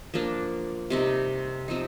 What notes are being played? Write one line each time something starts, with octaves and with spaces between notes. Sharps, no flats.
F3 A#3 D4
C3 G3 C4 D#4
C3 F3 C4 D#4